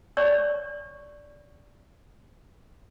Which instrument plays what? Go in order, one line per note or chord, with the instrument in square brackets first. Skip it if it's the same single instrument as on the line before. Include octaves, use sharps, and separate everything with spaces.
[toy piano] C#5 D5 C#6